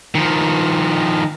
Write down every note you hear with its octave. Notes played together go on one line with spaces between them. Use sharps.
D#3 F3